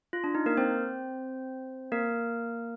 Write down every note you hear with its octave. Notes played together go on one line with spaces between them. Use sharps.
F4
D4
D#4
A#3 A#4
C4 C5
A#3 A#4